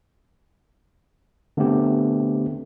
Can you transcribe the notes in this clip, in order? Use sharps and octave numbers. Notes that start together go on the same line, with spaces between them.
D3 A3 B3 C4 G4